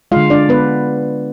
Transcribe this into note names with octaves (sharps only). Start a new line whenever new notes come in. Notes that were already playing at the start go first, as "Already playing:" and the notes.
D3 G#3 F4 F5
D4 D5
B3 B4